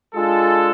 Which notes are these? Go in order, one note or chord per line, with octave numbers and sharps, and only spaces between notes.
G#3 D4 F4 A4